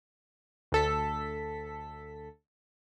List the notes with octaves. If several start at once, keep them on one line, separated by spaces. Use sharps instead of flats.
D2 A4 B6